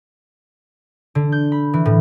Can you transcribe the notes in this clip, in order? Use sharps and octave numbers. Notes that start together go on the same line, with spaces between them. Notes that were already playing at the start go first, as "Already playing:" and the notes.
D3
G6
B5
E3
A2